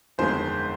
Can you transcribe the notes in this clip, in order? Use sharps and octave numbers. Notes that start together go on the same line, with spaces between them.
G1 F2 D#3 G#3 C4 C5